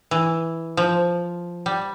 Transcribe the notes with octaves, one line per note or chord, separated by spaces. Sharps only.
E3
F3
G3